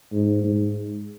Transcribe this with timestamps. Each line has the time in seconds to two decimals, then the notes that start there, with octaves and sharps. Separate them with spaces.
0.13 G#2
0.44 G#2